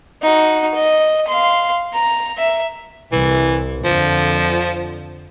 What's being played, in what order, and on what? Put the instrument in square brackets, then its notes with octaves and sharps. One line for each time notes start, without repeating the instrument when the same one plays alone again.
[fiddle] D#4 F#4
D#5
F5 C6
A#5
E5
[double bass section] C2 [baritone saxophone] E3
[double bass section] F2 D3 [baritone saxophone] F3